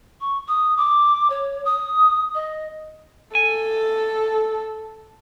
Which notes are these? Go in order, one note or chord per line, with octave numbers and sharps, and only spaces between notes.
C#6
D#6
D6
C#5
D#6
D#5
A4 G#5